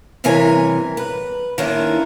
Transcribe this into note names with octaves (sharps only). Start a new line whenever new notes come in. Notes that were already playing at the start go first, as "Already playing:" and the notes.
G2 C3 E3 A#4 C#5 G#5
B4
D#3 A#3 C#4 D4 E4 F4